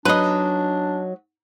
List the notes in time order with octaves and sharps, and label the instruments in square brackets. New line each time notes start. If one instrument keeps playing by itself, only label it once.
[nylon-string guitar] F#3 D#4 [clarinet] D4 [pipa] B4 D#5